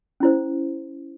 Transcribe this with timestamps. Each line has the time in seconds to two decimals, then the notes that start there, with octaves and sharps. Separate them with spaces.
0.20 C#4 E4 C5